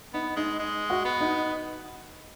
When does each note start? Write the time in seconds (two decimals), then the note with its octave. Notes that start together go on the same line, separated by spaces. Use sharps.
0.14 B3 D#4
0.36 G#3 D#4
0.59 G#3
0.90 F#4
1.05 B3
1.21 D#4